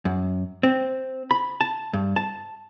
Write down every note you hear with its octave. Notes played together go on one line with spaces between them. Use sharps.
F#2
C4
B5
A5
G2
A5